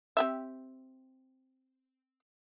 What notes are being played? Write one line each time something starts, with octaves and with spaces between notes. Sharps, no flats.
C4 G4 E5